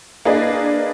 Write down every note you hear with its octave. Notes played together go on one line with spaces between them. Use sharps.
A#3 D4 G#4 B4 D5 D#5